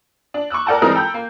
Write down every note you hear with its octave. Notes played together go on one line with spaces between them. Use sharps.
D4
C#6 D6 E6 F#6
A#4 D5 F#5 G5 A5 A#5
E3 G3 G#3 C4 D#4 A#4
A4 G5 A#5 B5 G6
A#3